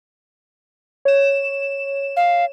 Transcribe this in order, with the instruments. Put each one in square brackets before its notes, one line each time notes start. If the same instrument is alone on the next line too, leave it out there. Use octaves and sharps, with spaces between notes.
[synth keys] C#5 E7
[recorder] F5